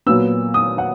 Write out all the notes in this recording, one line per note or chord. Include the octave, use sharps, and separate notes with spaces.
A#2 F#3 B3 E6
D#6
F#5